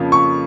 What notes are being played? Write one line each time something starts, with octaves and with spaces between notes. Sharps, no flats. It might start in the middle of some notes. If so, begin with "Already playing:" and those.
Already playing: F2 C#3 F3 A#3
C#6